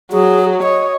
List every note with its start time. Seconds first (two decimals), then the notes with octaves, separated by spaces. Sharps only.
0.12 F#3 G#4
0.63 C#5 D#5